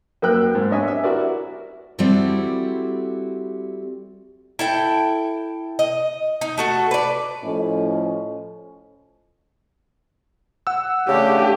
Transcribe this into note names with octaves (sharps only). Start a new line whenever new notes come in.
F#2 A#3 A#4 G5 E6 F#6
G#2
B3 D4 C#5 D#5 E5 G#5
E5
E4 F#4 A#4 D5
G3 C4 E4 F#4 G4 A4
E4 A4 G5
D#5
D#4
A3 F#4 A4
B4 D5
A2 F3 C#4 A4 D#5
F#5 E6
C#3 A3 D4 G4